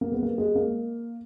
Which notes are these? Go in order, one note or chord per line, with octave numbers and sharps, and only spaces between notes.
A#3
G#3 B3
A#3
G#3
A#3